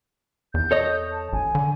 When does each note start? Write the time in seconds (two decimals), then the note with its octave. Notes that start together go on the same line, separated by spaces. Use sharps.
0.54 E2 G6
0.71 A4 C#5 D#5
1.12 A5
1.33 A1 G#5
1.55 D3